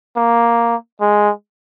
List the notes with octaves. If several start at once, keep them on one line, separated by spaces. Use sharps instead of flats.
A#3
G#3